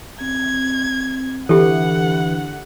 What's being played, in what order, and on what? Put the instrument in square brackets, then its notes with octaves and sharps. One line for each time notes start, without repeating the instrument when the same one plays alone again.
[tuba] C4 [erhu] G#6
[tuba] D3 [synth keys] E3 [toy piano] G4 A4 [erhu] F#5